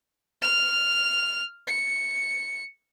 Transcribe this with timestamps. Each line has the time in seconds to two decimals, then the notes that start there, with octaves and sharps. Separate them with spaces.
0.42 F6 F7
1.67 C#7